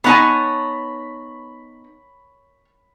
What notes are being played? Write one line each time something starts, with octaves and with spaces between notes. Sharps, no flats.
B3 D#4 C#5 F#5 G#5 A5 B5